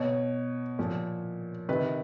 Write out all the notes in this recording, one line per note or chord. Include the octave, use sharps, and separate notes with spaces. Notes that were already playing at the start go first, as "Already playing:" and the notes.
Already playing: B2 C#5
A#2 F3
C3 D#3 B4